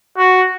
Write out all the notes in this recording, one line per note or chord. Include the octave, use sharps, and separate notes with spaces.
F#4